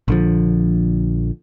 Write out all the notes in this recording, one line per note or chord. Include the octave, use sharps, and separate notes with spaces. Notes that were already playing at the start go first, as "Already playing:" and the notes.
A#1 D3 F3